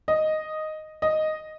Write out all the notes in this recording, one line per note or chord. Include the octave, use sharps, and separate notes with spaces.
D#5
D#5